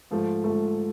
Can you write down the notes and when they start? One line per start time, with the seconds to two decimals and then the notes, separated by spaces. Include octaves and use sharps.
0.11 G#2 F3 A3
0.44 G#2 F3 A3